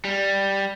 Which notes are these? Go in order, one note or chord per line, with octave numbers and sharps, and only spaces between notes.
G3